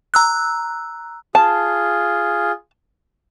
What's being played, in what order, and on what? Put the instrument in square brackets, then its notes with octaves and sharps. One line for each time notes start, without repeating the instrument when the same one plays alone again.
[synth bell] A#5 E6 F#6
[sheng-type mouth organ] F4 G#4 [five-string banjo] A5